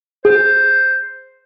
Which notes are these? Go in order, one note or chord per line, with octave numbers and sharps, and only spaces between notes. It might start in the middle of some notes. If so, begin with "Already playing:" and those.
G#4 C5